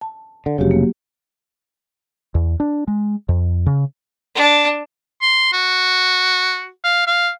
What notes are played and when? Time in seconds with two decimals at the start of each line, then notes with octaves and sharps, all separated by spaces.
0.01 A5
0.46 D3
0.58 F1 C#3 F#3 F#4 G4
0.71 A#3
2.35 E2
2.60 D4
2.88 G#3
3.29 F2
3.66 C#3
4.35 D4
5.22 C6
5.53 F#4
6.84 F5
7.07 F5